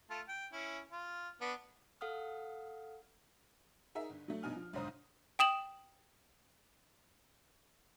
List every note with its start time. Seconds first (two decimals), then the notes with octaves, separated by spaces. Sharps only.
0.10 A3 F4 A5
0.28 G5
0.52 C#4 E4
0.92 F4
1.41 B3 D4
2.01 A4 F5 F#5 D#6 F6
3.95 D#4 G#4 A#4 E5
4.10 G1
4.28 F#3 A3
4.43 A#1 G2 B2 D#4 G#5 F6
4.56 F3
4.73 B1 G#2 D3 C5 A#5 D#6
5.39 G5 D#6 E7 F#7